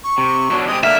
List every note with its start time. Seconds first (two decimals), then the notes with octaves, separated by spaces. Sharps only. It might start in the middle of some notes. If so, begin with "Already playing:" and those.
0.04 C#6
0.18 C3
0.51 B2 F#3 D4
0.68 G#3 C4 G4 D#6
0.84 D3 A#3 E5 F6